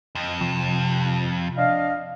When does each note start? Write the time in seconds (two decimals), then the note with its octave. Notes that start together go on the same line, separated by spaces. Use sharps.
0.15 F2 D#5
0.41 C3 F3
1.57 D4 D#5 F5